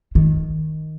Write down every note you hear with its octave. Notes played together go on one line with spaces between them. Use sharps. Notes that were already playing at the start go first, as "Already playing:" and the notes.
D#3